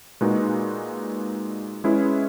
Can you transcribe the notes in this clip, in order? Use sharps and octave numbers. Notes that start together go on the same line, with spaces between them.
A#2 G#3 D#4 F#4 B4
G#3 C#4 E4 G#4 B4